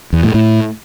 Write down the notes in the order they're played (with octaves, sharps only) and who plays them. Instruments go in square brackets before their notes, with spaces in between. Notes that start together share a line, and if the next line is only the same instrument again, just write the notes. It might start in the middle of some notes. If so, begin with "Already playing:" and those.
[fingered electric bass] E2
A2
A2